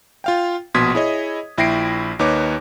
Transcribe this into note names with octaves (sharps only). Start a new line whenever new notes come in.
F4 F5 G5
A#1 B2 C6 D#6 G#6 B6
E4 G#4 C#5 D#5
A#1 E4 G5 A#6 C7 D7
D#2 D#4 B4 C#5 D6